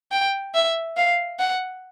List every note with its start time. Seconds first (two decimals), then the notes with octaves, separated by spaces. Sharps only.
0.12 G5
0.55 E5
0.97 F5
1.39 F#5